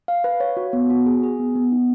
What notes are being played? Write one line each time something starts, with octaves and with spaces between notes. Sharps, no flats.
F5
B4
C#5
F#4
B3
F#4
G#4
G#4
B3
B3
D#4